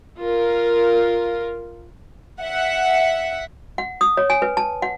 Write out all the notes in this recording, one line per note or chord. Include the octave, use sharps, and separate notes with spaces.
F4 A#4
E5 F#5
F#5
D#6
C#5
G#5
B4
A5
F#5